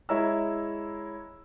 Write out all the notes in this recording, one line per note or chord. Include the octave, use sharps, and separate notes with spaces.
G#3 E4 C#5 A#5 E6